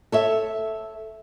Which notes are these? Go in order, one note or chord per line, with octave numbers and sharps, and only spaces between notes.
A4 C#5 E5